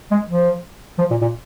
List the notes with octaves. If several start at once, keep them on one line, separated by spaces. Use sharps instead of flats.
G#3
F3
F3
A#2
A#2